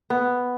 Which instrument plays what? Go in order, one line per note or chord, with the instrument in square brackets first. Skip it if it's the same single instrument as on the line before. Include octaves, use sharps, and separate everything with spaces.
[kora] B3